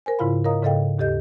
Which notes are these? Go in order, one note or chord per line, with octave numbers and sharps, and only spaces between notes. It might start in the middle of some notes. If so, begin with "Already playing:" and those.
A#4 C5 G#5
G#2 C#3 E4 F4 F5 B5
A#4 C#5 D#5 F5 A#5 D#6
G#2 C#3 A4 D#5 F5 G5
D#2 G4 A4 D#5 G6